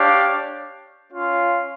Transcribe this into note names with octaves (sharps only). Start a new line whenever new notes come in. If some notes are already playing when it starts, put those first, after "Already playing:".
Already playing: D4 G4 C#5 F5
C#4 F4 C#5 F5